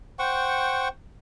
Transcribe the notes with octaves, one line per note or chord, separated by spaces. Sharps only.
C5 F#5 G5 C#6